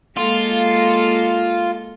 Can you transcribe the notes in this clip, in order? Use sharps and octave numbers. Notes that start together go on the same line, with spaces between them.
G#3 A#3 F4 A4